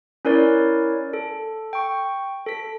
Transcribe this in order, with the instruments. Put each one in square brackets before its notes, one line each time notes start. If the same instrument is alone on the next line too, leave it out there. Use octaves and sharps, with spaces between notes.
[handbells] C#4 E4 A#4 C#5 D5
A4
G5 C#6
A4 B6